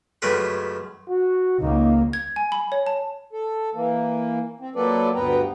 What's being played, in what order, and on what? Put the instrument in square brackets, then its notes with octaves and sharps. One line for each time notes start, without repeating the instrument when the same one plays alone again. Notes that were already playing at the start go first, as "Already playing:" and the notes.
[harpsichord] C#2 F#2 A3 A#4 B4 C6
[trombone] F#4
[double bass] C#2 A#3 [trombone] D#4
[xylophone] G#6
G#5
B5
C#5
A5
[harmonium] A4
E3 A#3
C4
F#3 A#3 F4 A4 B4 D5
D2 G2 B3 B4 G5 A#5